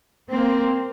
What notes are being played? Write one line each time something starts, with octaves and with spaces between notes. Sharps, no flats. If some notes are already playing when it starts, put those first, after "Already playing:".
A#3 C4